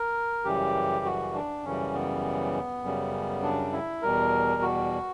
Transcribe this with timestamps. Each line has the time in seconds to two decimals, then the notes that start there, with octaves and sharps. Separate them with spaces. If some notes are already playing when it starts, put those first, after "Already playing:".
Already playing: A#4
0.45 F#2 C#3 E3 G3 G4
1.05 F#4
1.34 D4
1.64 F#2 C#3 E3 G3 C#4
1.94 B3
2.83 F#2 C#3 G3
3.43 D4
3.72 E4
4.02 E2 B2 G3 A#4
4.62 F#4